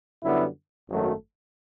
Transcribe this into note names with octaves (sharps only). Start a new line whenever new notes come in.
F#2 D3 G3 B3 E4
G#1 F#2 D#3 F#3 A3